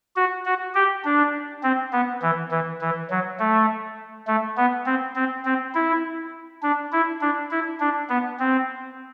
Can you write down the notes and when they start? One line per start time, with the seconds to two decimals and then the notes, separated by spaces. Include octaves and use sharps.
0.16 F#4
0.46 F#4
0.75 G4
1.05 D4
1.63 C4
1.93 B3
2.22 E3
2.51 E3
2.81 E3
3.10 F#3
3.39 A3
4.27 A3
4.57 B3
4.86 C4
5.16 C4
5.45 C4
5.75 E4
6.63 D4
6.92 E4
7.21 D4
7.51 E4
7.80 D4
8.09 B3
8.39 C4